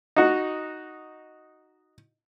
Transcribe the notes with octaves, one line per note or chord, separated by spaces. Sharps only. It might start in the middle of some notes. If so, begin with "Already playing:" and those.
D#4 F#4